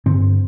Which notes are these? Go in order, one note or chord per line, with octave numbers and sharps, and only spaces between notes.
G2 D3 C4